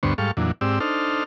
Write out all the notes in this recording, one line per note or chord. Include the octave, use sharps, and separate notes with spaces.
D2 G2 D3 B3 C5 C#6
G#2 G3 A4 F5 C#6
F2 A#2 E3 F#3 D4
G#2 C4 G4 D5 E6
D4 D#4 A4 C5 F6